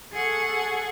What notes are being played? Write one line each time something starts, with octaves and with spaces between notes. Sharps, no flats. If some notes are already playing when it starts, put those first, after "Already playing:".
G#4 A4 F#5 C#6